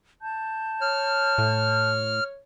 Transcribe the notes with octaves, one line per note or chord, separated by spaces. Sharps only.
A5 G6
C#5 F6
A2